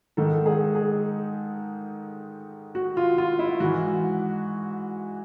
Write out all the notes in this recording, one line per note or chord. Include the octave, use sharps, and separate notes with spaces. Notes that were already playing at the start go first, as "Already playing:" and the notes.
G#2 D#3 A4
G#4
G#4
F#4
F4
F4
E4
G#2 E3 F#4